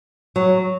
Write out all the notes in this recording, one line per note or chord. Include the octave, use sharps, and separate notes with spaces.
F#3